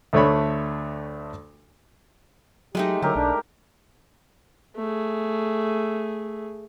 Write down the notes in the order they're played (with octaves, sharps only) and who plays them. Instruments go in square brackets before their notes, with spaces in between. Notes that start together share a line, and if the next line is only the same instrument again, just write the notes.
[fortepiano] D2 A3 D4 C#5 B5
[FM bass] F#3 [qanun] G#3 A3 D#4 [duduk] G4
[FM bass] D3 [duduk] F#3 [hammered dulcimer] G4 A#4
[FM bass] B1 [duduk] D4
[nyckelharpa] A3 G#4